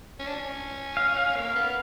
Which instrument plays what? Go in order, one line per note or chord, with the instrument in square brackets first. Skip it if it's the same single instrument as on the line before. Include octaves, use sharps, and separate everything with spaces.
[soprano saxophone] C#4
D4
C#4
[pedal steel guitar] F5
F5
[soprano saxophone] A#3 [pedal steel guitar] F5
[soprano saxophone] B3